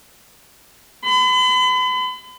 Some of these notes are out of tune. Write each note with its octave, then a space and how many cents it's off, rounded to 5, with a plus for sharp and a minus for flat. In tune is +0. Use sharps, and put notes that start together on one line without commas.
B5 +40